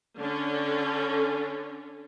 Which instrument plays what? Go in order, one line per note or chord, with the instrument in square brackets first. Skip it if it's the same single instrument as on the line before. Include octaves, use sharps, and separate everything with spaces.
[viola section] D3 C#4